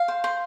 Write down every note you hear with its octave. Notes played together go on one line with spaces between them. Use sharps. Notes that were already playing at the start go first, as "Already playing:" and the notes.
Already playing: F5
C5
C5